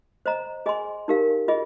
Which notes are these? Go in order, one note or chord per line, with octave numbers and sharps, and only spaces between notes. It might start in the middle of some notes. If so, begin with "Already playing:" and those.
C5 D#5 A#5
G#4 D#5 G#5 C6
D#4 G4 A#4 F5
F4 G#4 D#5